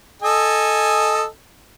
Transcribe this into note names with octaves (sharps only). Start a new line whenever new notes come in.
A4 D#5 G#5